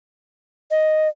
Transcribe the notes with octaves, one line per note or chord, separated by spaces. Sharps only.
D#5